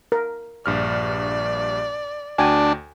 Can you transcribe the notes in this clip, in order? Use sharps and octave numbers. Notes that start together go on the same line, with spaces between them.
A#4
A#1 G2 D5 F6
D2 D4 F#4 G5 G#5